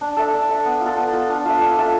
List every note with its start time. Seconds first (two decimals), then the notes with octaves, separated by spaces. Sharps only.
0.01 D4
0.17 A4 E5
0.33 D4
0.49 A4 E5
0.65 B3
0.81 F4
0.86 A4
0.97 B3
1.13 F4 A4
1.30 D4
1.45 F4 A4 E5
1.61 D4
1.78 F4 A4 E5